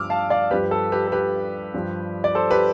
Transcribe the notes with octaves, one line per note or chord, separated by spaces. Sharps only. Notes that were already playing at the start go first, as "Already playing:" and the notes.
Already playing: G2 F3 D6 E6 F6
F5 A5
D5 F5
G2 F3 G4 B4
A4
G4 B4
A4
G4 B4
G2 F3
D5
A4 C5
G4 B4